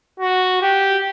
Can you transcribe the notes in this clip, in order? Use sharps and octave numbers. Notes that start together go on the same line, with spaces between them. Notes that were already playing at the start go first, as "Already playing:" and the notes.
F#4
G4